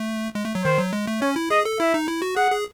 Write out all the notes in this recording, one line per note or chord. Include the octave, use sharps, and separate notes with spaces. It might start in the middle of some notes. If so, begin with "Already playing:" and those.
Already playing: A3
G#3
A3
F#3
D#3 C5
F#3
G#3
A3
C#4 C#5
E4
G#4 D#5
A4
E4 E5
D#4
E4
F#4
G#4 F#5
G#4